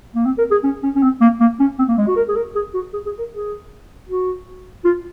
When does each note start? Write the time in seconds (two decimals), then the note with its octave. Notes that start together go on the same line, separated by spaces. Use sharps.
0.15 A#3
0.26 C4
0.38 A#4
0.51 G#4
0.63 C#4
0.83 C#4
0.96 C#4
1.03 C4
1.21 A#3
1.40 A#3
1.59 C#4
1.79 C4
1.88 A#3
1.98 G#3
2.07 F#4
2.16 A#4
2.29 G#4
2.36 A#4
2.55 G#4
2.74 F#4
2.93 G#4
3.06 G#4
3.19 A#4
3.32 G#4
4.08 F#4
4.85 F4